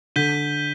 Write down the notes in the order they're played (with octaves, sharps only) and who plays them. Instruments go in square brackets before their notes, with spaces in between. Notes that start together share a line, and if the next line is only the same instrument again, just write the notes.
[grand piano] D3 [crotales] G6 B6 D#7 G7